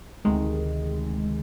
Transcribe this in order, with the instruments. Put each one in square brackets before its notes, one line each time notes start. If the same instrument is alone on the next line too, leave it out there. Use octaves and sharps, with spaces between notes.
[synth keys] D2 C3 D#3 G#3